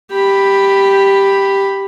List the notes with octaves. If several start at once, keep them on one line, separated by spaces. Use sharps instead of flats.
G4 B5